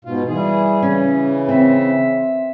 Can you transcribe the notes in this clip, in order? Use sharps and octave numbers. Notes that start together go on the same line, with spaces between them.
G#2 B2 F4
E3 G3 G#4
C#3 E3 C#4
C4 E5